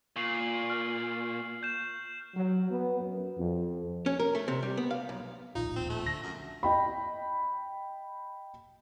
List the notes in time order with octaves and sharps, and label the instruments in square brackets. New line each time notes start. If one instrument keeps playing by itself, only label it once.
[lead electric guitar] A#2 [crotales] C#6 C7 F#7
[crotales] F6
G6 E7
[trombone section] F#3
B3
F#2
F2
[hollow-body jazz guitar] C#4
A#4
A3
C3
G3
B3
F5
B1
[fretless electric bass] D1 A#1 D#2 [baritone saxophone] D#4 [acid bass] F4
[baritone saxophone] C4
A3
[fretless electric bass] D3 [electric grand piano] A#6
[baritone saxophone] F#2
[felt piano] D#5 G5 B5